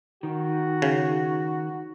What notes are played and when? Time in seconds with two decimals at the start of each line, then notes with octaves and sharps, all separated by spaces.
0.23 D#3 F#4
0.82 C#3